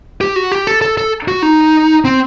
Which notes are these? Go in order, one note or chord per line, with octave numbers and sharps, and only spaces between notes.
G4
F#4
G4
A4
A4
A4
F#4
D#4
C4